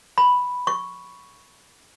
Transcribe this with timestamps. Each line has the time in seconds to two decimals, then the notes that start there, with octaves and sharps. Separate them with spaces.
0.18 B5
0.67 C#6